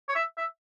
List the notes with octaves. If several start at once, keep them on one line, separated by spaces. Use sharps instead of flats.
C#5
E5
E5